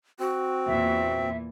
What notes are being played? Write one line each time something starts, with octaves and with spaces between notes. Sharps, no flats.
C4 F#4
E2 A#2 E3 E5